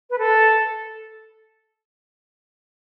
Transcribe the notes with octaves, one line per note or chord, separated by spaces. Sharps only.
B4
A4